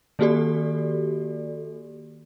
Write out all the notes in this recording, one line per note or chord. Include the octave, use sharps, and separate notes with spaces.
D#3 A#3 F#4 G4 A4 D5